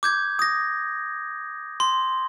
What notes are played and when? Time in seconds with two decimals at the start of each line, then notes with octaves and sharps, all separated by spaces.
0.03 D6 G6 G#6
0.39 D#6 A#6
1.80 C6